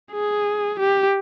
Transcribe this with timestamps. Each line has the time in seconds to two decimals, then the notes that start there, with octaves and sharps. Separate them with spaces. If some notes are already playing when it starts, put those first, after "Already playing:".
0.12 G#4
0.79 G4